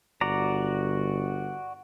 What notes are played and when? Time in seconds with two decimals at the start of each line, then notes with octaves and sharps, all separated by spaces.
0.21 G1 F#4 D5 A#5